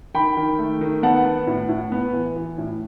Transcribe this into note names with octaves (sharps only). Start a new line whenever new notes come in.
D#3 G5 B5
D#3
A3
D#3
B3 F#5 A5
B3
A2
A2
B3
E3
E3
A2